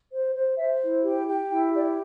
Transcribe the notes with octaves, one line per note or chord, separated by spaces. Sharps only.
C5
C5
C5 E5
E4
G4
G4 G5
E4 G5
G4 D5